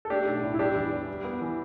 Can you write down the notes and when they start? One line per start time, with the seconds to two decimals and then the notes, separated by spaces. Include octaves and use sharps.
0.05 A4
0.10 A3 D4 G4
0.27 B1
0.43 A2
0.54 E4
0.59 G3 D4 G4
0.76 E2
0.92 E3
1.08 G3
1.24 B3
1.41 E3